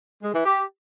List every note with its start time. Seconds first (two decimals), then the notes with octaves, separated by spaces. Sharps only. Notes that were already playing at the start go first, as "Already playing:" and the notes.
0.23 G#3
0.34 E3
0.45 G4